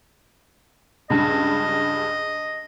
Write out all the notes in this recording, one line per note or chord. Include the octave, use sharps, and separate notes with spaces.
C#2 G2 D#5